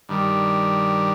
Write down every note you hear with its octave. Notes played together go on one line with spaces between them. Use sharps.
G2 D#3 G3